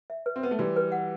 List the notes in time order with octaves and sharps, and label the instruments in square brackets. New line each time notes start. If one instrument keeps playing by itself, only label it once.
[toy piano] E5
B4
[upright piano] C4
[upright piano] B3 [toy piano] B4
[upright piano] A3
[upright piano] E3 G3 [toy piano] F#4
[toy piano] B4
F#5